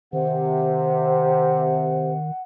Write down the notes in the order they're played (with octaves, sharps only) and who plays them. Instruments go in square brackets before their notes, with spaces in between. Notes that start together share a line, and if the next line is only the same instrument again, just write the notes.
[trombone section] C3 [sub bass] D#3 [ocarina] C5 [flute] F#5